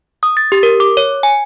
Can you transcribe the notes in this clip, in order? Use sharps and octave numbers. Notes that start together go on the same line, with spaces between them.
D#6
A6
G4
A#4
D6
C#5
G#5